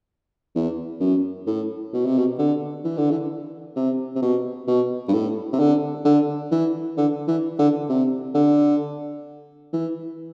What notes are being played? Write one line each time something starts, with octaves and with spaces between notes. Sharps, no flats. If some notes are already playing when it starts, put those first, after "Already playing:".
E2
F#2
A2
B2
C3
B2
D3
E3
D3
E3
C3
C3
B2
B2
G2
A2
C3
D3
D3
E3
D3
E3
D3
C3
D3
E3